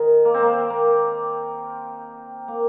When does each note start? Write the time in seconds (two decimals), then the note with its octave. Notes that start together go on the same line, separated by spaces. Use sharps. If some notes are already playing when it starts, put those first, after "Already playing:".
Already playing: D#3
0.25 A#3
0.34 C4
0.42 A#3
0.70 A#3
2.48 A#3